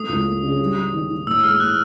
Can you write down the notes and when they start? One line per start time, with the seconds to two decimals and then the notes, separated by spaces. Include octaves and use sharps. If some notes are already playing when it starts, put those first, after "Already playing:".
Already playing: A3 D#6
0.09 C#2
0.26 A3
0.43 C#3
0.60 G3
0.77 G3
0.93 D#3
1.09 D#3
1.27 A2 E6
1.44 G#3 F6
1.60 A2 F#6